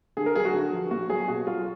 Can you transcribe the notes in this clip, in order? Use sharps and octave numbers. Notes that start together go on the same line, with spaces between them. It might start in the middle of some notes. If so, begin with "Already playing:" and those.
D3 G#4
A#4
F#3 G#4
F#4
D3
F3
A#2 F#4
F#3 G#4
B2 F#4
F#3 F4